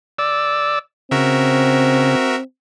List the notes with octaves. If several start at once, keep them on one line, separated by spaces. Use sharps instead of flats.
D5 E6
C#3 C4 F#4 A#4 E5